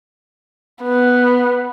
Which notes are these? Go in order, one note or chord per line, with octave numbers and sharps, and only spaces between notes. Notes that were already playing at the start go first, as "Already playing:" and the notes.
B3